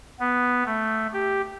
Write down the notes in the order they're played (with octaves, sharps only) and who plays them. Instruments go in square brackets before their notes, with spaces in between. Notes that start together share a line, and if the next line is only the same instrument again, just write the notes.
[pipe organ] B3
A3
G4